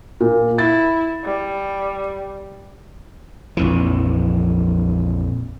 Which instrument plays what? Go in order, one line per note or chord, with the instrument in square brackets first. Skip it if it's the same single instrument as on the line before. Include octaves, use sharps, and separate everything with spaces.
[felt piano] A#2
[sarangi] E4 [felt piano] A6
[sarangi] G3
[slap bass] A#1 F2 E3